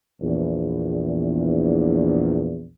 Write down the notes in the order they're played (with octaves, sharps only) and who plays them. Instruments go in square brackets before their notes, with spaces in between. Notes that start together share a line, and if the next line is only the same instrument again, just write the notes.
[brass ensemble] A#1 E2